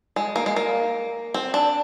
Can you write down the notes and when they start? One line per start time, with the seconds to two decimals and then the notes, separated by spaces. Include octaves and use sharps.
0.16 G#3
0.36 A#3
0.46 G#3
0.56 A#3
1.34 C4
1.54 D4